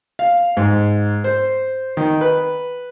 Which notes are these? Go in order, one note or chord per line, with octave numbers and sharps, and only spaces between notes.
F5
G#2
C5
D#3
B4